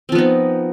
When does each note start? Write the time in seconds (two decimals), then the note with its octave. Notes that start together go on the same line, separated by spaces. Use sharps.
0.09 C4
0.12 F3
0.15 B3
0.18 D#4